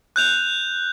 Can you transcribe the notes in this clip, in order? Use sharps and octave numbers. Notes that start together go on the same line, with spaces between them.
F#6 G6 F7